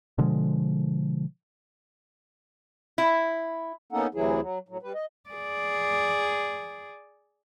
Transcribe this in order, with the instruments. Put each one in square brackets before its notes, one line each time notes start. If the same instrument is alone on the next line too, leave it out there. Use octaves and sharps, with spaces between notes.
[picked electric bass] B2 D3 F3 G#3
[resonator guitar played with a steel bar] E4
[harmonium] A#3 B3 C#4 D#4 A4 F#5
D2 C3 E3 F#3 E4 G#4
F#3
A2 F#3
G3 B4
D#5
[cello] G#4 D5